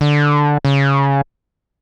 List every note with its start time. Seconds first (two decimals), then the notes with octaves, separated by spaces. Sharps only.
0.01 D3
0.65 C#3